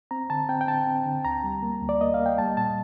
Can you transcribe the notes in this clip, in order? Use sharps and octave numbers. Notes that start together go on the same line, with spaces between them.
C4 A#5
D3 A5
C4 G5
G5
D3 A5
C4
D3
D2 A#5
G3
A#3
D2
D5
A#3 D#5
F5
A#3
G5
G3 A5
A#2 A5